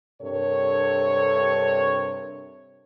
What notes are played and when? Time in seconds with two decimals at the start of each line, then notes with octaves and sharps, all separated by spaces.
0.22 G2 C3 D4 A4 A#4 C#5